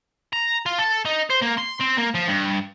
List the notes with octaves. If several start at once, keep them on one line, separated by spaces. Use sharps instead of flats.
A#5
F4
A4
D#4
C5
A#3
C6
C4
A#3
F3
G2